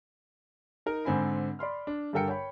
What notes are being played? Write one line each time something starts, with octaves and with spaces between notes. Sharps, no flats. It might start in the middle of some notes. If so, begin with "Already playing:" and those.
D#4 A#4
G#2 D3 C4 G#5 B5
D5 B5 C6 F6
D4
G2 D3 A4 A#4 G5 C#7
C#5 G5 B5